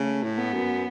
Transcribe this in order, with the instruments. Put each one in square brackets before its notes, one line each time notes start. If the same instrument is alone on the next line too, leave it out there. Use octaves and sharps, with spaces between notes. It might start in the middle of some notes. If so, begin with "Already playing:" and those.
Already playing: [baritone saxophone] C#3 [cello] A3
[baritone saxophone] A2
[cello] B3
[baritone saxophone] F#2